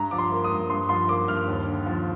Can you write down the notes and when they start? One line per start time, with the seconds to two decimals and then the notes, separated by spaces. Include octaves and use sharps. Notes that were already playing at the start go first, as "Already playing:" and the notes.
Already playing: G2 A#5
0.11 F3 D6
0.18 C6
0.31 A#3
0.44 D#6
0.51 G2
0.70 G2 C6
0.89 F3 C6
1.08 A#3 D6
1.28 G2 F6
1.48 D#2
1.66 D3
1.86 F3